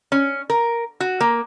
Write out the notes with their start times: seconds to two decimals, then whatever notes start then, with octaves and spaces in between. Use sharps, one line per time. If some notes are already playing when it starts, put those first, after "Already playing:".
0.12 C#4
0.50 A#4
1.00 F#4
1.21 A#3